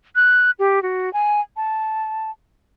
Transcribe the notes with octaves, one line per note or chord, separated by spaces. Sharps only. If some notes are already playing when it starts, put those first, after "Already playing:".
F#6
G4
F#4
G#5
A5